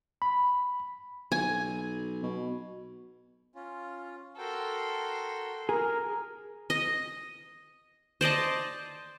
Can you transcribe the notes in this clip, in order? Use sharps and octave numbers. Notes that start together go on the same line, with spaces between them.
B5
B1 G#5
B2
C#4 F4
F#4 A4 A#4 G5 C6
G#4 A#4
D#5
C5 D5 D#5 A5